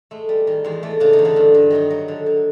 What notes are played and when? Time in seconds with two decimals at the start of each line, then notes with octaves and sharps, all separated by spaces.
0.11 G#3 A3
0.29 G3
0.47 D#3
0.64 E2 G#3
0.83 E2 A3
1.00 C#3 D4
1.13 D#4
1.19 E2
1.25 D3 D4
1.36 G2
1.54 G2
1.70 D#3 F#3 D#4
1.90 F#3
2.08 D3
2.26 D3